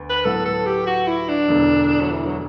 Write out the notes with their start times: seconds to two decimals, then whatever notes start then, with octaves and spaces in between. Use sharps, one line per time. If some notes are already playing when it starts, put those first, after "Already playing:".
Already playing: D2 B3
0.10 B4
0.25 A2 F#3 B3 F#4 A4
0.45 A4
0.66 G4
0.86 F#4
1.07 E4
1.28 D4
1.48 E1 E2 D3
2.01 F#3
2.10 E3
2.26 F#3